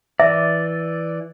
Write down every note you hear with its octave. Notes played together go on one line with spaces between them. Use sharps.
E3 D5 E5